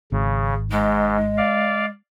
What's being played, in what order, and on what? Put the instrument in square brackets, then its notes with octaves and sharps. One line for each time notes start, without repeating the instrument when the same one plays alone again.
[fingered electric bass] G#1 [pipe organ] C#3
[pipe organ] G#2 [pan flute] G#3
[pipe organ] D5 F5